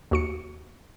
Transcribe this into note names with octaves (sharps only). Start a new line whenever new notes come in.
D#2 F#4 C#7